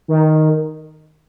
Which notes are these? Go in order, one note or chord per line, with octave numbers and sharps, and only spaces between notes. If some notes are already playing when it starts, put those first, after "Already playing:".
D#3